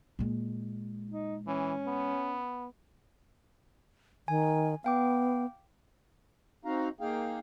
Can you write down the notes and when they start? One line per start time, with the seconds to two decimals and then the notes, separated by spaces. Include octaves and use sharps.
0.19 A#2 G#3
1.10 D#4
1.47 E3 C#4
1.87 B3
4.28 D#3 G#5
4.84 B3 F5 G5 D6
6.65 C4 D#4 F#4 F5 A#5
7.01 A#3 D#4 G#4 F5 G5